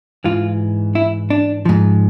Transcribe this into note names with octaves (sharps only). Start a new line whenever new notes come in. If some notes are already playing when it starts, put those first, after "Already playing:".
G#2 E3 F4
E4
D4
G#2 F3